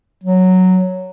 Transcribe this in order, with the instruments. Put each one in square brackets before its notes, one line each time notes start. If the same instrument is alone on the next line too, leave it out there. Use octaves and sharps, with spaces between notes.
[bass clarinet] F#3